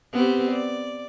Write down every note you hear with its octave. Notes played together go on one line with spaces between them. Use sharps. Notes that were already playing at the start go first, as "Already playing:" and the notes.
B3 C4 G4
D5